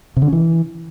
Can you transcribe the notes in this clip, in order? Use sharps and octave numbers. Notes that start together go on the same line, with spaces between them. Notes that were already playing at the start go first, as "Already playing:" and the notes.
C3
D3
C#4
E3